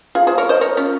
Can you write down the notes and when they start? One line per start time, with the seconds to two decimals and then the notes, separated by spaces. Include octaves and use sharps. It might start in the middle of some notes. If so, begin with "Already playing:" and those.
0.15 F4 G#4
0.27 G#4 C5
0.38 A#4 C#5
0.49 C5 D#5
0.61 A#4 C#5
0.77 C#4 F4